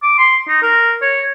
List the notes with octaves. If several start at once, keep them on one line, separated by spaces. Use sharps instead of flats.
D6
C6
D#4
A#4
C#5